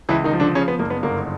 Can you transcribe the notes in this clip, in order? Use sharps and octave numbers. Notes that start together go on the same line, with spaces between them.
C#2 E3 E4
D#3 D#4
F3
D3 D4
C#3 C#4
B3
F#1 A#3
B3
G1 A#3